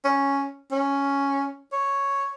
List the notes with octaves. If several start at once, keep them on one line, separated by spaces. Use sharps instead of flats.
C#4
C#4
C#5